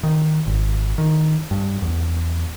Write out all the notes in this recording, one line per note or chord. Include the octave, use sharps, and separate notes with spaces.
D#3
G#1
D#3
G2
E2